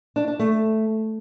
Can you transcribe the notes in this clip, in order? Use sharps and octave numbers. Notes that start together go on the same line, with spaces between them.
D4
D4
A3